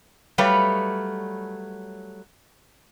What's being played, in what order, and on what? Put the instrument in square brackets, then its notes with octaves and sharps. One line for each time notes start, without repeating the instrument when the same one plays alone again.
[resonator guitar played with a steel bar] F#3 G3 A3 B4 C#5 F5